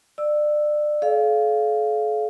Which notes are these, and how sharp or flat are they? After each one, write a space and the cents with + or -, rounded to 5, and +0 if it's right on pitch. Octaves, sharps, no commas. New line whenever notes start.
D5 +25 E6 +0
A4 -45 D5 -20 F5 -5